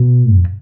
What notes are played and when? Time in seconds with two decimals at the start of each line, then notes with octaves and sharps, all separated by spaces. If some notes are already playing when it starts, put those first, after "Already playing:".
Already playing: B2
0.34 F2